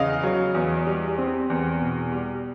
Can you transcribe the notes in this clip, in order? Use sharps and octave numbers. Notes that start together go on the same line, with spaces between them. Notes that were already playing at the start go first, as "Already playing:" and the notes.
Already playing: E2 C#3 D#5 F5
F#3
E2
G3
C4
E2
B2
G3